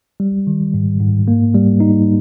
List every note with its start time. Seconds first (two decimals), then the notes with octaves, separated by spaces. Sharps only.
0.20 G3
0.47 D#3
0.74 G#2
1.00 G#2
1.28 A#3
1.54 G3
1.80 D#4